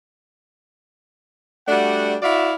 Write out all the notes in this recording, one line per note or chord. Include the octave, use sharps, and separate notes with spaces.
G3 A3 D4 F#4 F#5
E4 F#4 D5 E5 F5